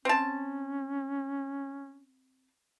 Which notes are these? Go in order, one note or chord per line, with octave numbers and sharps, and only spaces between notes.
C4 C#4 A5